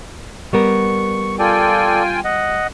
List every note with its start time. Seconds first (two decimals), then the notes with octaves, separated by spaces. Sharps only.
0.53 G3 B3 A#4 C#6
1.39 F4 A4 D5 G5 G#5
2.24 D#5 F#5